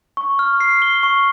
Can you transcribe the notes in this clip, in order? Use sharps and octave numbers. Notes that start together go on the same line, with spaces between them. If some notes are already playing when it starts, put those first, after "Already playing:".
C#6
F6
C7
G7
C#6